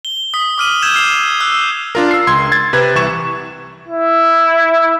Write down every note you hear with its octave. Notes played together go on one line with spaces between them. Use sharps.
G7
D#6 B6
D6 F6 D#7 F#7
E6 G6 G#6 D#7 E7 G7
F6 C7 F7
E6 F#6
D4 F4 A#4
E6 C7
C#2 C6 G#6
G#6 A6
C3 B4 G#6
C2 E3 C#6 E7
E4